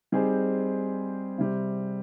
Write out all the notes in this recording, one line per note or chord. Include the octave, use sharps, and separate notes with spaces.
G3 C4 D#4 G#4 C5
C3 G3 C4